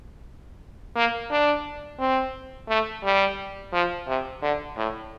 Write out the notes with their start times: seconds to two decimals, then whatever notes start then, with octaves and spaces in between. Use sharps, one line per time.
0.96 A#3
1.31 D4
1.99 C4
2.69 A3
3.04 G3
3.73 F3
4.08 C3
4.42 D3
4.76 A2